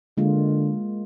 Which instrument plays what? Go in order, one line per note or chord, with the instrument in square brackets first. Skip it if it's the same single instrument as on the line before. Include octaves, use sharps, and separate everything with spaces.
[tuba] D3 [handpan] G#3 A#3 F4